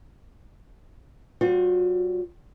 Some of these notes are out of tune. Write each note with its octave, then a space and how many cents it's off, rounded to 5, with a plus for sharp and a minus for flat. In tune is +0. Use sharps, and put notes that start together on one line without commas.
G3 -45 F#4 -45 C5 +0